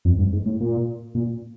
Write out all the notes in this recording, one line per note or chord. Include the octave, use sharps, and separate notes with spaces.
F2
G2
G#2
A2
A#2
A#2